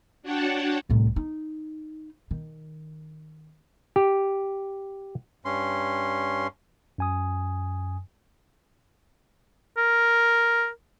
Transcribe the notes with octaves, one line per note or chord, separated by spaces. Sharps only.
D4 F#4 C#5 F#5 G5 A5
C2 A2
D#4
D#3
G4
G2 C#4 C6
F#2 G#5 D#6
A#4